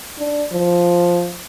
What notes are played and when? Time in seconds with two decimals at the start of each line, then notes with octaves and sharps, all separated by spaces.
0.19 D4
0.52 F3